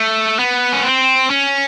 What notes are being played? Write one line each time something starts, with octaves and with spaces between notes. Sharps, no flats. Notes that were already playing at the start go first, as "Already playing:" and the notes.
Already playing: A3
B3
C#4
C4
C#4